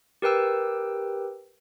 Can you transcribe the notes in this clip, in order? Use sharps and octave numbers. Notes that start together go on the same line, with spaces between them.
G4 A#4 B4 G5 E6